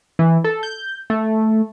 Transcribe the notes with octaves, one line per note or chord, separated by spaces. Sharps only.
E3
A4
G6
A3